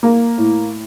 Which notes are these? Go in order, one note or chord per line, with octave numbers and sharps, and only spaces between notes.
A#3
A2